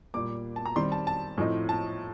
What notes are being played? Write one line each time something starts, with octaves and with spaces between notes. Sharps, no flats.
A#2 G3 A#3 D6
A5
A#5
D#3 G3 C4 C6
A5
A5
A2 F3 C4 D#4
A5